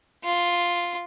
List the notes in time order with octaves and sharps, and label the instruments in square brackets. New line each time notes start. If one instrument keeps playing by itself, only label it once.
[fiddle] F4